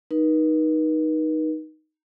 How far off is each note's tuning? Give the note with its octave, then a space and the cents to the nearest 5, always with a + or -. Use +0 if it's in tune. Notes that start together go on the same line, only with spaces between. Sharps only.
D#4 +0 B4 -45